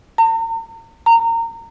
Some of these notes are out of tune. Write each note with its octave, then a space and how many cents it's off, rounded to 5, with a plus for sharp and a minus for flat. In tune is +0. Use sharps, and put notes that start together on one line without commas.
A#5 -40
A#5 -25